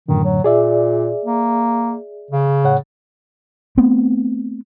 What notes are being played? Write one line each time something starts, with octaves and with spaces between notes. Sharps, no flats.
F#2 A2 D3 D#3
F#3
A#2 G#4 D5 E5
A#3
C#3
A2 C#5 F#5
A3 B3 C4